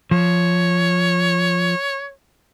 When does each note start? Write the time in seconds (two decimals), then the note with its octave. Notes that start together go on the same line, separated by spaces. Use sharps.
0.11 F3 C#5